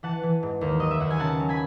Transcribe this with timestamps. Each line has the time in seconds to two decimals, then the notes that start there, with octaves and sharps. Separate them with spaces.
0.03 E3 F#5 A5
0.23 E3
0.43 G#2
0.61 D#2
0.80 F#3 D#5
0.91 E5
1.00 D#2 F#5
1.10 G#5
1.20 C#3 F#5 A5
1.40 F#3
1.49 G#5 B5